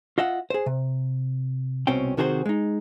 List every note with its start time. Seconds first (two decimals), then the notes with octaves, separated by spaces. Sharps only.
0.18 F4 D#5 E5 F#5
0.50 G#4 C5
0.66 C3
1.87 C2 B2 C4 C#4 G5
2.17 C3 D#3 F#4 G#4 A4 C5
2.46 G#3 D#4